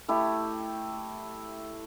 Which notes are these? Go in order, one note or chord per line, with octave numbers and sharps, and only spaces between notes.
A3 E4 G4